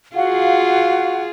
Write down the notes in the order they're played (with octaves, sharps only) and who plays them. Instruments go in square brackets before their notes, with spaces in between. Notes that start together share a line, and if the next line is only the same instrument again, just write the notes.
[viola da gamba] F4 G#4 [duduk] F#4 [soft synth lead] F5 [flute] F#5